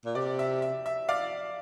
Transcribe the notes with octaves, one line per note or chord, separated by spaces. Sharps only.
A#2
C3 D5
E5
E5
E5
D5 F5